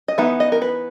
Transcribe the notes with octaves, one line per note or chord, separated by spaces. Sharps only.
D#5
E3 B3 D#4 E5
D#5
A#4
B4